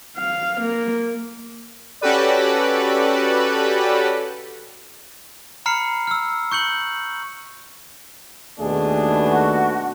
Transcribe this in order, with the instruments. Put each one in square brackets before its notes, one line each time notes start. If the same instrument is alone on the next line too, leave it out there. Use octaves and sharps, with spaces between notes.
[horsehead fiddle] F5
A#3
[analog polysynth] C#4 F#4 G4 A4 B4 D5
[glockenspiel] A#5 B5 F6 C7 C#7
E6 F6
C#6 G6 C#7 F#7
[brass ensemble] D#2 B2 A3 [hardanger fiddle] D4 [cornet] G#4
[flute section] F#4